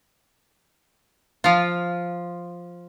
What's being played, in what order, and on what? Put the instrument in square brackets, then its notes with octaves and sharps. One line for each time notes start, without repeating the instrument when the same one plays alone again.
[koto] F3 F4